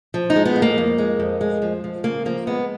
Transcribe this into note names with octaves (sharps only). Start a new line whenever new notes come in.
F3
D#4
G#3
B3
F2
A#3
F2
G#3
F2
G#3
F3
F3
C#3 A#3
F3 A#3
G#3 B3